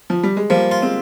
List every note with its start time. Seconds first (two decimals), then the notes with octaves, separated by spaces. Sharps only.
0.10 F3
0.23 G3
0.37 G#3
0.50 F3 G3 A#3
0.71 F4
0.82 G#3 C4